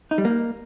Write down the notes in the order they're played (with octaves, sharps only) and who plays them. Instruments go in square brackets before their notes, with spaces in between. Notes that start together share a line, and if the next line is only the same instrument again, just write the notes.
[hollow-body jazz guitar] D#4
G3
A#3